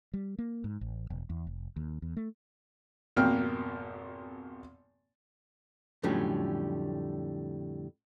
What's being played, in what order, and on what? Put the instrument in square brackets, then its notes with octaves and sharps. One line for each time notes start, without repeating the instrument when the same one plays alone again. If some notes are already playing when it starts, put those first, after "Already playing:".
[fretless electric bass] G3
A#3
G#2
A1
E1
E2
F1
D#2
E2
A3
[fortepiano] G#1 F2 B2 A#3 G5 F6
[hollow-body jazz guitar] F2 A2 D3 F#3 G3 C#4